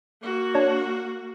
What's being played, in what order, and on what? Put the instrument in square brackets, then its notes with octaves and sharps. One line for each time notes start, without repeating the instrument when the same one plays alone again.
[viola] A#3 F#4
[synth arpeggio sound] D4 C#5 D5